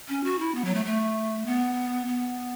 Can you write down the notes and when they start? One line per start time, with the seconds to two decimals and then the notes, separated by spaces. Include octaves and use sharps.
0.09 C#4
0.24 F#4
0.39 E4
0.55 B3
0.65 F#3
0.75 A3
0.86 A3
1.46 B3
2.07 B3